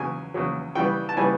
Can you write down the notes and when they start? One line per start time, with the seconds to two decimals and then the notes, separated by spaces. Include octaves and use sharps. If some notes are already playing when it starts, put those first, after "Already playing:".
Already playing: E2 C#3 F#3 G#5
0.34 E2 C#3 F#3
0.75 C#3 E3 G3 B3 G5
1.09 A5
1.17 C#3 E3 G3 B3 G#5